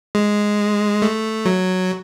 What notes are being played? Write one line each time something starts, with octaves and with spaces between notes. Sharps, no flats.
G#3
A3
F#3